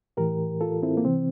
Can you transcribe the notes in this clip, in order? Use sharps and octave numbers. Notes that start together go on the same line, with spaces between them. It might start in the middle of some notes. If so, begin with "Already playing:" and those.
A2 E3 G4 A#4
F4 A4
C4 E4
A#3
C3 E3 C4